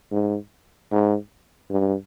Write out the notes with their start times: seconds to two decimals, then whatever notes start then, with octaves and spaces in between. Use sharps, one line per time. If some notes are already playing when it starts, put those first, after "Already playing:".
0.12 G#2
0.92 G#2
1.71 G2